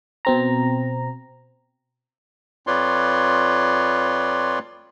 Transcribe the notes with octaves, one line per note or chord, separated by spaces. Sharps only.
B2 C4 A#5
F2 F4 B4 C#5 D5 C6